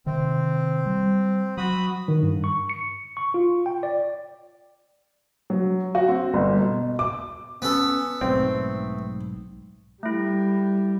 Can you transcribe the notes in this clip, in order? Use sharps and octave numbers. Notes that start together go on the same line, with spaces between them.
C3 D#3 C4
G3
F#3 F#4 B5 D#6
D#3
G2
C#6
C#7
C#6
F4
G5
D5
F#3
F#4
C4
G1
B2
D6
B3 C#4 A4
B1 G#2 A3 C4
G3 A3 E4